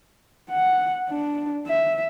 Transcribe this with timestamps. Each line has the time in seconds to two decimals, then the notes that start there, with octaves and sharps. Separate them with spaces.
0.51 F#5
1.10 D4
1.67 E5